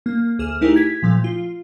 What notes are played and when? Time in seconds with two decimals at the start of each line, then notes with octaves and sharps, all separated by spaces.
0.06 A#3
0.39 D2 G#4 F6 E7
0.61 A3 D#4 E4 G4 G#4 A#4
0.76 G#6 B6
1.02 A#2 F3 A3
1.24 F4